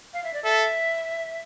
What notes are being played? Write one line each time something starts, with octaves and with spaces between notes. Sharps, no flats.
F5
E5
D5
A4 E5